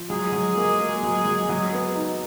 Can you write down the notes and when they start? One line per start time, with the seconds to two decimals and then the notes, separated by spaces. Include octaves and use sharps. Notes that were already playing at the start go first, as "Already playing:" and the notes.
Already playing: F3
0.10 F#3 G#3 G#4
0.32 F#3
0.56 A#3
0.79 A#3
1.03 F#3
1.25 F#3
1.49 F#3
1.73 B3
1.95 D#4